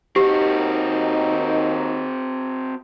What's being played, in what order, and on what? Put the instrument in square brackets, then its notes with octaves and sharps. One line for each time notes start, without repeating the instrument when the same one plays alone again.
[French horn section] D#2 D#3 D#4 [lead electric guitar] C4 F#4 [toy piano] G4